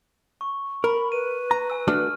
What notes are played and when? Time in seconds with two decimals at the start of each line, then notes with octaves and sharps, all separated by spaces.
0.41 C#6
0.84 A#4 B5
1.12 B4 D#7
1.51 A#5
1.70 G#5 E6
1.88 A3 D4 F#4 F6